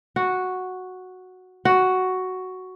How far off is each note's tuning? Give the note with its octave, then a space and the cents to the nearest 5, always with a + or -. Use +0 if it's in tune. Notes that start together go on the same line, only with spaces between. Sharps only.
F#4 -5
F#4 +5